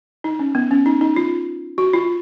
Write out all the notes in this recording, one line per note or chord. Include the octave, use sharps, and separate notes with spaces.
D#4
C#4
B3
C#4
D#4
D#4
F4
F#4
F4